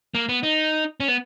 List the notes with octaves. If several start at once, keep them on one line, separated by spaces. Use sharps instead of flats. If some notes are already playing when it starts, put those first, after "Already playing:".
A#3
B3
D#4
C#4
B3